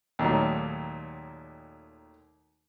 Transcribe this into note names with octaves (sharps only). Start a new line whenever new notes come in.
D#2 A#2 D#3 F#3 A3